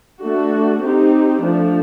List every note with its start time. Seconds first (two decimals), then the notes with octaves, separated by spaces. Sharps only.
0.21 A3 D4 F#4
0.82 C4 D#4 G4
1.43 F3 A3 D4